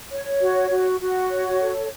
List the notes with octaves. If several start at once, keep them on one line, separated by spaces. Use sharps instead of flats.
C#5
F#4
F#4
F#4
C#5
A4